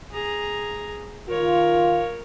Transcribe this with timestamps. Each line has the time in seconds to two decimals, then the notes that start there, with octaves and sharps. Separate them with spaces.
0.11 G#4 A#5
1.29 D#3 F4 A#4 C#5